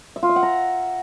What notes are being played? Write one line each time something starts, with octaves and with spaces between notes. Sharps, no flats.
E5
F4
E5
F#5
A#5